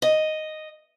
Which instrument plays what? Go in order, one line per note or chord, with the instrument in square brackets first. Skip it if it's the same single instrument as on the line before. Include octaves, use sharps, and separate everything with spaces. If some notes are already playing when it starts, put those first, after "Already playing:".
[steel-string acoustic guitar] D#5